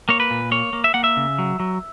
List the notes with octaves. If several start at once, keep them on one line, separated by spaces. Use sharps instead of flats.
A#3 C#5
B4
A#2
A#3 C#5
A#3
E5
A#3 F#5
E5
C#3
F#3
F#3